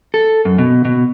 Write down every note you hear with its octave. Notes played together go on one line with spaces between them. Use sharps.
A4
F#2
B2
B2